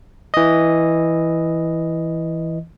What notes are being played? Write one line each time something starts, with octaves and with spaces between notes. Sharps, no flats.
E3 D#5